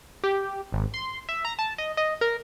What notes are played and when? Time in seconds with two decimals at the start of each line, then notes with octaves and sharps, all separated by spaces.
0.24 G4
0.72 G#1
0.94 C6
1.29 E5
1.45 A#5
1.59 A5
1.78 D#5
1.97 D#5
2.21 A#4